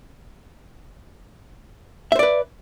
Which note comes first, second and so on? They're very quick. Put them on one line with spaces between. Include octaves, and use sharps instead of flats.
E5 C5 D5 B4